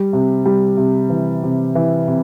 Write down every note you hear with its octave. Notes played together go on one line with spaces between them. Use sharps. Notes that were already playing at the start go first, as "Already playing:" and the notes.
Already playing: G3
C3
G3
C3
E3
C3
E3
C3